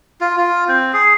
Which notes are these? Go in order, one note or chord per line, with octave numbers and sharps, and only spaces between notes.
F4
F4
C4
G#4